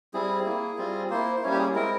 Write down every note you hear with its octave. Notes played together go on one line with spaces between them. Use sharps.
G3 C4 E4 G#4
A#3 E4
G3 C4 F4
A#3 E4 C5
C5
G3 A#3 C#4 E4 C#5
G4
G#4
G#3 C4 E4 A#4